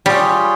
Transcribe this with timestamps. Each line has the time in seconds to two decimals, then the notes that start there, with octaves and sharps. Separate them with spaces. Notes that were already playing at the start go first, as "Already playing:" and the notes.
0.06 G3 F4 G#4 C#5 G5